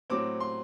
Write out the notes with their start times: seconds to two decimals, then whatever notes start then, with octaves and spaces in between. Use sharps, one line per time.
0.10 A2 F#3 C4 D6
0.40 C6